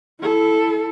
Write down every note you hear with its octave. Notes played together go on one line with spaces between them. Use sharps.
E4 A4